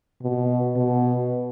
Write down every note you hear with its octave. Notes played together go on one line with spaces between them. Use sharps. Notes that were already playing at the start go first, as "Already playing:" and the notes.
B2
B2